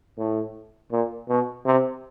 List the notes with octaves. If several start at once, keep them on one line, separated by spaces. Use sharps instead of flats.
A2
A#2
B2
C3